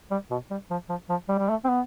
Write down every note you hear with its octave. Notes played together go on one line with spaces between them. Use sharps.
G3
B2
G3
F3
F3
F3
G3
G3
A3
C4
B3